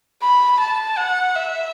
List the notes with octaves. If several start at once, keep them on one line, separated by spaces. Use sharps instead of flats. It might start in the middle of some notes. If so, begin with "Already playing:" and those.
B5
A5
F#5
E5